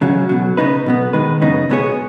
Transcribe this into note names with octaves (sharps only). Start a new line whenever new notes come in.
C#2 C#3 F#3 C#4
B1 B2 F#3
C#3 B3 D#4 B4
B1 B2 B3
D#3 G#3 D#4 B4
F#2 C#3 B3 D#4
C#2 B2 B3 G#4 C#5